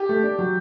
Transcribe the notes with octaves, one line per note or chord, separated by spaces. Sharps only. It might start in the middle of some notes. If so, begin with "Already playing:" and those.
Already playing: G4
A3
D4
F#3